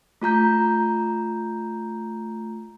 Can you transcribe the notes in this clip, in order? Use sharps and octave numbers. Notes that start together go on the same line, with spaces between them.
A3 F4 A#5 G6